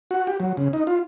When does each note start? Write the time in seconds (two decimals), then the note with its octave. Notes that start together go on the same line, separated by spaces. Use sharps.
0.11 F#4
0.27 G4
0.40 F#3
0.57 C#3
0.73 D#4
0.87 F4